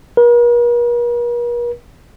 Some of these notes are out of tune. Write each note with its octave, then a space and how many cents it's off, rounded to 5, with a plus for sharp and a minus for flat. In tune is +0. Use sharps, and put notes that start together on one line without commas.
A#4 +45